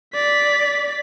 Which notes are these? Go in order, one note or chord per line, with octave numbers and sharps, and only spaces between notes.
D5 B6